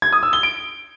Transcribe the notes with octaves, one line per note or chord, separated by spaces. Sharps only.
G#6
D#6
E6
G7
D7